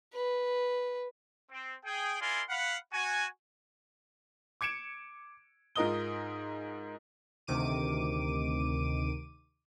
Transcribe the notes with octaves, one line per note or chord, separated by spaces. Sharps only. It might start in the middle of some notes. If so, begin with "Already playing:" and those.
B4
C4
G#4 G5
E4 F4 A#4 D5 G#5 C6
F5 F#5 B5
F#4 G#5
D6 G#6 C#7 D7 E7
G#2 F4 A#4 D#5 D#6 G7
D2 C3 D#3 D6 D#7